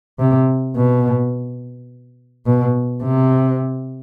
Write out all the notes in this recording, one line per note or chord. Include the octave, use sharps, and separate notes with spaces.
C3
B2
B2
C3